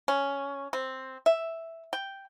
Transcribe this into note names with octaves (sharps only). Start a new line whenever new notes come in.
C#4
C4
E5
G5